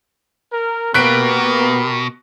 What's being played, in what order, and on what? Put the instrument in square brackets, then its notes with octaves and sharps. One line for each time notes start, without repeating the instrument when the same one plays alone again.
[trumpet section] A#4
[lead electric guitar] B2 [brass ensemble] A#3 B3 [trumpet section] G4 A#4 [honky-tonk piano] F#6 B6 D7